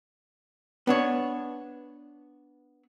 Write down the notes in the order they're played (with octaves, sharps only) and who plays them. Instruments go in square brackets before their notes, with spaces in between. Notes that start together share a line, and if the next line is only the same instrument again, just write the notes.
[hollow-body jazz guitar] B3 D4 C#5